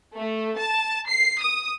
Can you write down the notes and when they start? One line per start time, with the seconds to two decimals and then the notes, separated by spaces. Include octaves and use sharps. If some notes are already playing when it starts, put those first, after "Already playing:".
0.15 A3
0.57 A5
1.10 C7
1.40 D#6